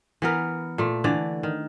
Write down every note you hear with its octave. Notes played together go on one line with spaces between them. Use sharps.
E3 B3 A#4
A#2 A3
D3 E3 D5
D#3